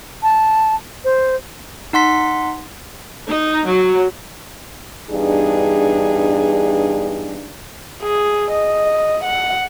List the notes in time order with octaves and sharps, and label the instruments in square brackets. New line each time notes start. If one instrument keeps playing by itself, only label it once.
[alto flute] A5
C5
[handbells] D#4 F#5 C6 B6
[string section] D#4
F#3
[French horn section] E2 G2 D4 D#4 G#4
[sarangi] G#4
D#5
F#5